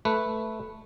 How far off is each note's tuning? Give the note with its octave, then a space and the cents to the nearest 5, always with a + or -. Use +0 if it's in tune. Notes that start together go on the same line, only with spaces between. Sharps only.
A3 +0 B4 +0